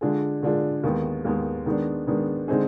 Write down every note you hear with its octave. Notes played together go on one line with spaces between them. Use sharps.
D3 G#3 D4 F4 G#4
D3 G#3 D4 F4 G#4
D#2 D#3 G#3 B3
D#2 D#3 G#3 B3
D#3 G#3 B3 D4
D#3 G#3 B3 D4
D3 G#3 C4 D#4 G#4